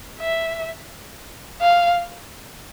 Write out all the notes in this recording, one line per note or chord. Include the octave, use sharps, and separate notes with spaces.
E5
F5